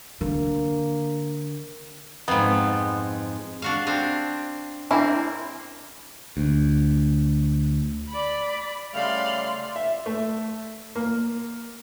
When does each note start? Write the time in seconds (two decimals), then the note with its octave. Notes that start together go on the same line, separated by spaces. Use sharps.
0.21 D3 A#3
2.28 F2 G#2 B3
3.62 D4 F#4 F5
3.87 C4 D4 F5
4.91 A#3 C4 D4 E4
6.37 D2
8.10 D5 B5
8.94 C#3 G3 A3 D5 F5 C6
9.76 E5
10.06 A3
10.95 A#3